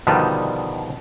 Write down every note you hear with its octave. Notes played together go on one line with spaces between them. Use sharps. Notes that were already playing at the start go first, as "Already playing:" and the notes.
B2 D3 D#3 F3 G3